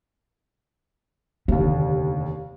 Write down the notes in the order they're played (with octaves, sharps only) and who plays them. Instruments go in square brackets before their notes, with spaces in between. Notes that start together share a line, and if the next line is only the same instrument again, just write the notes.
[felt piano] F1 D#2 [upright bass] D3